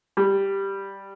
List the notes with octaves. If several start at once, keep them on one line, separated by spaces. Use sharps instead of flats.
G3